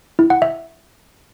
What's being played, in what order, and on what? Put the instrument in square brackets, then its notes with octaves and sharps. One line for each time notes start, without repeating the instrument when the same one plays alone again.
[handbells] E4
F#5
E5